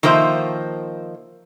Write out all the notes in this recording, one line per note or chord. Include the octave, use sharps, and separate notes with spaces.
D#3 F3 A#3 C5 E5